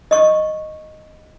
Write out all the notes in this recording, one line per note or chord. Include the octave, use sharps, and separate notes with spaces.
D#5 C#6